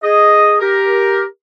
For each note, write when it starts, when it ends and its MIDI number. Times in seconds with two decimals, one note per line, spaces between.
0.03 0.56 68
0.03 0.56 75
0.61 1.24 67
0.61 1.24 70